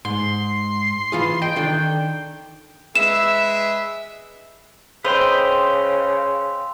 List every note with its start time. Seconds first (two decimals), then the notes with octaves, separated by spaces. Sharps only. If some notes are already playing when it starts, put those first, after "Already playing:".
0.05 G#2 C6
1.12 E3 F4 G#4
1.42 D#5 G5
1.56 D#3 D4 A4
2.96 G#3 B4 E5 E7
5.05 C#3 B4 C5 D#5 G5 C6 E6 F7